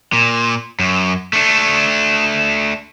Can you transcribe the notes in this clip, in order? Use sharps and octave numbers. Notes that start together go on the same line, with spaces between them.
A#2
F#2
A3 D4